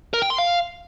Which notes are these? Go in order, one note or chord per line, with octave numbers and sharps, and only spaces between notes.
A#4
G5
C6
F5